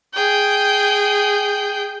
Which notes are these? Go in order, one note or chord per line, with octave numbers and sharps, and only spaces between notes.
G#4 G5